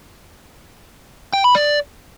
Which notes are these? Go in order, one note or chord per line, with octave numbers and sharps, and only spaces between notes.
G5
B5
D5